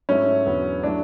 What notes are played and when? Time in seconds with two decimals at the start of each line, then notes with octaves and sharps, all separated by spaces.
0.09 G#2 F#3 A3 C#4 E4
0.46 E2 D3 F#3 B3
0.83 F#3 A3 D4 E4